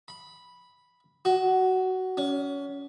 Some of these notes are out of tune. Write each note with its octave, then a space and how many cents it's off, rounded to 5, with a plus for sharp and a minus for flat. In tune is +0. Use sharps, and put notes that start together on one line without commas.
B5 -5
F#4 +15
C#4 +25